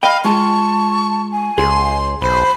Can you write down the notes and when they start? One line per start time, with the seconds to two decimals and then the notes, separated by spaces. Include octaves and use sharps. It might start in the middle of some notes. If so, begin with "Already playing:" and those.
0.03 D#5 F5 G5 B5
0.24 G#3 F4 A5 C#6
1.32 G#5
1.58 C#2 G#4 C6
2.22 B1 C5 B5